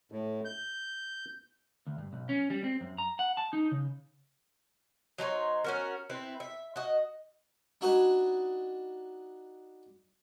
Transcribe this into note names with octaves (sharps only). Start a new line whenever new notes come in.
A2
G6
D2
G2
B1
C#4
G3
C4
F#2
A#5
F#5
A5
D#4
C#3
F#3 D#4 C5 C#5
C#4 F#4 A#4
C4 E4 B4
E5
F#4 D#5
D4 D#4 F#4 B4 D#5 G#5